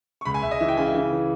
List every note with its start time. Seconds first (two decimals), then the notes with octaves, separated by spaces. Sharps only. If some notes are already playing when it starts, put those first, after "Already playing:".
0.21 C#6
0.25 C#2 B5
0.34 G#5
0.42 C#2 E5
0.51 D#5
0.60 E3 E5
0.69 G5
0.77 C#3 G#5
0.86 E5
0.95 E3
1.12 E3